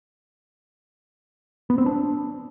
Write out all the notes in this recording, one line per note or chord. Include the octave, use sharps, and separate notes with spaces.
B3
C4
D4